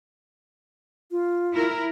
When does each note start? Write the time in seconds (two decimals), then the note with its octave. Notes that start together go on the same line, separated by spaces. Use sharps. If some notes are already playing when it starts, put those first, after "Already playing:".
1.11 F4
1.54 E4 A#4